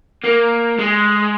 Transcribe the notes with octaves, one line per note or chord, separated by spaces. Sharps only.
A#3
G#3